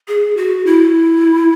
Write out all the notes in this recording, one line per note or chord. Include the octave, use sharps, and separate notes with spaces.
G#4
F#4
E4